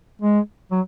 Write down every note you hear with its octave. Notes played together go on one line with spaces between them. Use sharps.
G#3
F#3